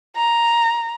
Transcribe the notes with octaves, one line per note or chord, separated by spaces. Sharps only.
A#5